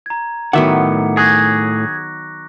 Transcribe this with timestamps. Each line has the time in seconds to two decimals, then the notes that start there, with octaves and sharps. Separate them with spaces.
0.06 A#5 G#6
0.53 A2 D#3 F#3 B3 E5 F#5 D6 C#7
1.17 G#4 C#6 F#6 A#6